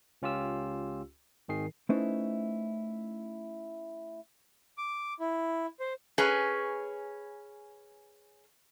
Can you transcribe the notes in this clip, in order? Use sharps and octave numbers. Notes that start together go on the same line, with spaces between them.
C#2 C#4 F4 G4 E6
G#1 D#3 G#4 C7
A3 C#4 D#4 E4 B4 C5
D6
E4
C5
C#4 G#4 B4